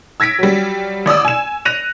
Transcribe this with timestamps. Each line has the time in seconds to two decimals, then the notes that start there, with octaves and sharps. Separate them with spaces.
0.20 E6 G#6 A#6 B6 D7
0.39 F#3 G3
1.06 A1 D5 D#6 E6
1.25 G#5 E7
1.65 F#6 A#6 D#7 F7